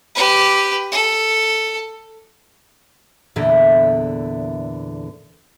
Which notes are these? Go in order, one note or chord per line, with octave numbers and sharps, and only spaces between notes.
G4 B4
A4
E2 A#2 D3 E3 E5